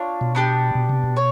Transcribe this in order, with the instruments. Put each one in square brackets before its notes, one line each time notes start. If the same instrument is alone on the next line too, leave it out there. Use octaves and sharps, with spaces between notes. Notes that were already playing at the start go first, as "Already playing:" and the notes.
Already playing: [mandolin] D4 F4 C#5
[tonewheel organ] B2
[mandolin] B3 D4 G4
[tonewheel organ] B2
C3
B2
[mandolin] C#5